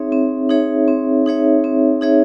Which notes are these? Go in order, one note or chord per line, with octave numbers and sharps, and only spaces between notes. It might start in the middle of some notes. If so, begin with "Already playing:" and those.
Already playing: C4 D#4 G#4 C#5 E5
C4
D#4 G#4 C#5 E5
C4
D#4 G#4 C#5 E5
C4
D#4 G#4 C#5 E5